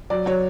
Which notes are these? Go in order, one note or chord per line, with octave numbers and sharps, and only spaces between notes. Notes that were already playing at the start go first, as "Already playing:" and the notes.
F#3 D5
F#3 C#5